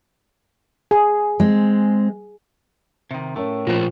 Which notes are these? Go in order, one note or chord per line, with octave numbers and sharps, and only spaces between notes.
G#4
G#3 C4
C3 D#3
A2 A3 C#4 A#4
A#2 F3 F4 C5